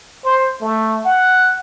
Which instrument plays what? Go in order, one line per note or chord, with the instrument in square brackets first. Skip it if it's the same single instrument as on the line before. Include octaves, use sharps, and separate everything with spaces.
[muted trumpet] C5
A3
F#5